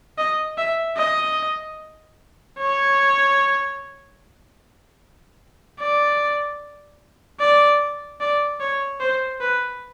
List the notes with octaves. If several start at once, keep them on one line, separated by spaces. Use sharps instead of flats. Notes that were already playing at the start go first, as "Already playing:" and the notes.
D#5
E5
D#5
C#5
D5
D5
D5
C#5
C5
B4